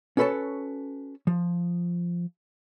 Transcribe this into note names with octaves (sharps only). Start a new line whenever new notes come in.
C#4 F#4 A4 B4 C#5 A5
F3